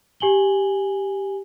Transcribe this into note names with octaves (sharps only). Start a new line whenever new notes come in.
G4 G#5 F#7 G7